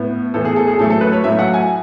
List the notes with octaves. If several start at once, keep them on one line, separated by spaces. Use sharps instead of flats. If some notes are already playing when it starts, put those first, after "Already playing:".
Already playing: A2 B3
A2 E3 B3 A4
G#4
A4
G#4
A2 F#3 A3 A4
A4
B4
C#5
A2 F#3 A3 E5
F#5
G#5